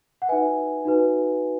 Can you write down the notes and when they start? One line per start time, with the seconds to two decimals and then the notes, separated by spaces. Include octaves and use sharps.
0.22 F#5
0.29 D#4 F#4 B4 E5 G#5
0.85 D#4 F#4 B4